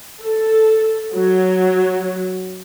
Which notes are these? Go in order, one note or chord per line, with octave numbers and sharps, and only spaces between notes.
A4
F#3